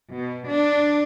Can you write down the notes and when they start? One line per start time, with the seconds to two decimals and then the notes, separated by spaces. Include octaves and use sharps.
0.11 B2
0.48 D4